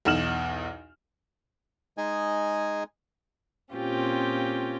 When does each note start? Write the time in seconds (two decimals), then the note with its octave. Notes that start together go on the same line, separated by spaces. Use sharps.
0.05 B1 E2 D#4 F6 E7 F#7
1.98 G#3 D#4 G#4 D#5 G#5
3.74 A#2 C4 C#4 F4 G4